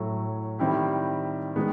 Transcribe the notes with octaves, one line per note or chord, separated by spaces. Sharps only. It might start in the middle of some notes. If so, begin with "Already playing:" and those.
Already playing: A2 F#3 A3
D#3 G3 C4 E4 G4
D#3 G#3 B3